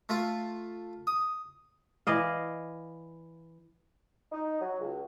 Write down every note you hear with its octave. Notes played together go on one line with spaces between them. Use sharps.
A3 F4
D#6
E3 D5 D#5 F5
D#4
F#3
C#2